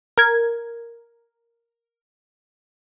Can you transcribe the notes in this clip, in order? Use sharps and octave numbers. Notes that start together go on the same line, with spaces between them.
A#4 G#6